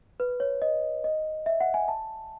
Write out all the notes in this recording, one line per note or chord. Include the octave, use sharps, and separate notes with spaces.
B4
C#5
D#5
D#5
E5
F#5
G#5
A5